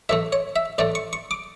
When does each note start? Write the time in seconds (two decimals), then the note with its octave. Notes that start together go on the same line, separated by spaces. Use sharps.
0.09 A2 E3 A3 E5
0.32 C#5
0.56 E5
0.78 A2 E3 A3 D5
0.95 C#6
1.13 C#6
1.31 D6